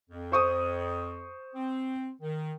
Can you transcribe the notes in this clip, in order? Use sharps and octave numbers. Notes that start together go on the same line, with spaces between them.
F2
C5 C#6 D#6
C4
D#3